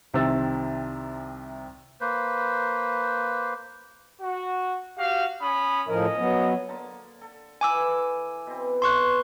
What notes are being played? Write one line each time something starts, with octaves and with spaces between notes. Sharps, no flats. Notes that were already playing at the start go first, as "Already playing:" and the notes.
C2 C3 D#3 C4 E6 A6
A#3 B4 C5
F#4
F#4 G4 F5
C#4 B5 D#6
A2 F3 C#4 A#4 D#5
F#3 B3
D3 A#3 A5
A4
E3 G#5 D6 E6
B2 C4
E3 C6 C#6 F#6